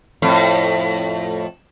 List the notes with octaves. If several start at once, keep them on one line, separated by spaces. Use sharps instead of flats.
F2 A2